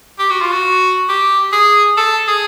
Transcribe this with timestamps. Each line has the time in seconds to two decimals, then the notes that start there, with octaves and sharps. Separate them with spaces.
0.19 G4
0.31 F#4
0.42 F4
0.53 F#4
1.09 G4
1.53 G#4
1.97 A4
2.28 G#4